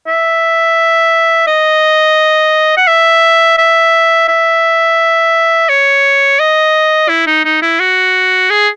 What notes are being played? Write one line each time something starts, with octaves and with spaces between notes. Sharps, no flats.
E5
D#5
F#5
E5
E5
E5
C#5
D#5
E4
D#4
D#4
E4
F#4
G#4